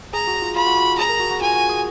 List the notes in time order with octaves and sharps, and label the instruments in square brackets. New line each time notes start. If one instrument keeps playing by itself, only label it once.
[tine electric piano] G#4 [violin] A#5
[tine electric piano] F#4
F4
[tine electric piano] F4 [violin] B5
[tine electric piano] F#4
F#4
F#4
[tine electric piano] G#4 [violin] A#5
[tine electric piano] A#4
F#4
F#4
[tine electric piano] F4 [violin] G#5
[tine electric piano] F#4
G#4